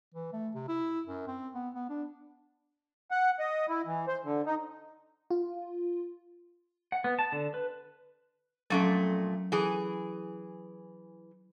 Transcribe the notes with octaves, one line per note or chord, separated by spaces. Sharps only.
E3
A3
C3
E4
F#2
C4
B3
B3
D4
F#5
D#5
E4
E3
C5
D3
D#4
F4
F#5
B3
A5
D3
B4
F2 A#2 F#3 A3 C#4
E3 G#4